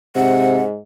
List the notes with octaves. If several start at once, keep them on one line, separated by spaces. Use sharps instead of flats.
G#2 C3 F#5